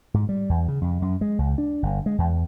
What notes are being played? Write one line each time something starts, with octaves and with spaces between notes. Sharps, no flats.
G#2
G3
E2
C#3
F2
F#2
G#3
C#2
D4
G1
G#3
E2